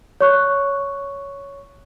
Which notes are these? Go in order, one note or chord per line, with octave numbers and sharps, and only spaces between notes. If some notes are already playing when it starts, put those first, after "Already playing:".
C#5 C#6 F#6